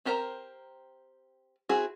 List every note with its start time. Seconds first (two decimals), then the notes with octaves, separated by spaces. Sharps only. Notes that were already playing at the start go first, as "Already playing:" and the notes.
0.05 C4 G4 A#4 C5 A#5
1.69 C4 E4 F#4 G#4